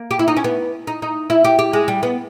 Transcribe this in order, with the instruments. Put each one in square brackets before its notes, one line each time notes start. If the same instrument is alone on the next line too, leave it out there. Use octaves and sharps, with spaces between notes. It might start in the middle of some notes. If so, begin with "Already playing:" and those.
Already playing: [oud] A#3
G4
E4
D#4
C#4
B3
D#4
D#4
E4
G4
G4
G#3
G3
B3